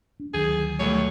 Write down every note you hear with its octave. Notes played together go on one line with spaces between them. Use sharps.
D4
D2 D#3 F#3 G#4
B1 G3 A3 C#5